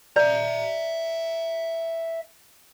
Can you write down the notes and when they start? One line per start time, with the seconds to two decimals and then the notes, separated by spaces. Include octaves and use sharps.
0.16 D5 E5 A#5